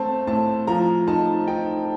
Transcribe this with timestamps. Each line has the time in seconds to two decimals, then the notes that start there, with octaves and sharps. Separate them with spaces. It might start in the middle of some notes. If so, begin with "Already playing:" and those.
Already playing: A3 C4 A5
0.27 A2 A5
0.67 F3 A#5
1.07 D#4 A5
1.48 D#4 G5